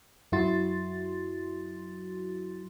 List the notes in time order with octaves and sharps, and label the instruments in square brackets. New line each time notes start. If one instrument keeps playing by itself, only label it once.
[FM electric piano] F#2 F#3 E4 F#4 C6 A6